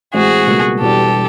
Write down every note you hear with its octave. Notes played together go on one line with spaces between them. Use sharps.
A2 E3 G#3 C4 E4 F#4 G#4
C#2 B2 G3 A#3
E1 E2 B2 G3 G4 A4